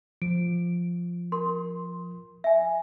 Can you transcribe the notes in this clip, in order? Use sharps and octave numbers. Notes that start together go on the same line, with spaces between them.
F3 D7
A#4 C6
E5 G#5